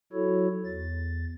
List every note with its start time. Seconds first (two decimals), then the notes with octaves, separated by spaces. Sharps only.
0.13 F#3 E4 F#4 A4 C#5
0.65 E2 A6